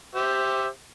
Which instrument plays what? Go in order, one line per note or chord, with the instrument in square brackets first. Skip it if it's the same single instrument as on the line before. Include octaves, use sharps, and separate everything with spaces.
[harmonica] G4 C5 E5